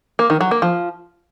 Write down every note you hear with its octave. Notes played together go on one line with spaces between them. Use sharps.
A#3
D#3
F#3
A#3
F3